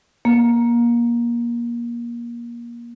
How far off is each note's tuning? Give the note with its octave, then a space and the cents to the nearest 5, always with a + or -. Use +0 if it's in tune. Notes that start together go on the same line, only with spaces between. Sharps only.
A#3 +25